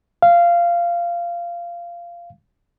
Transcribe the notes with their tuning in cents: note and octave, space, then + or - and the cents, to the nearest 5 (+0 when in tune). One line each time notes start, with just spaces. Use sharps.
F5 -15